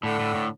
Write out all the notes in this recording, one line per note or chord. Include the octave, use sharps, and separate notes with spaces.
A2 D3
A2
A2